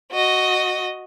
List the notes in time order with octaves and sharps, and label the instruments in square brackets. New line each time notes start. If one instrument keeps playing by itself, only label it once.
[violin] F#4 D#5